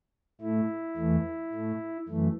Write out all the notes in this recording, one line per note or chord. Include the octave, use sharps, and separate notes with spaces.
A2 A3 E4
E2 E3 A3
A2 A3
F#2 E3 A3